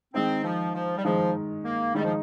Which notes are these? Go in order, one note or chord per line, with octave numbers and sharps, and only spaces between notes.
D#3 G#3 C4 D#4
F3
F3
G3
D#3 F3 G#3 D#4
A#3
D#3 G3 G#3 D#4
F3